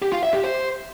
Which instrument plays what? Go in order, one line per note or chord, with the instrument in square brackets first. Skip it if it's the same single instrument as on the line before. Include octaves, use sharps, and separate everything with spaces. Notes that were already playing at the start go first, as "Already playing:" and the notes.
[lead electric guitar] G4
F4
E5
G4
C5